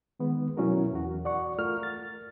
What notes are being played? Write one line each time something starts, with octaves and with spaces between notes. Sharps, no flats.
D#3 G#3 B3
B2 F#3 C#4 E4 F#4 A#4
E2 F#4
D5 F#5 C#6
A3 F4 A#4 F6
A6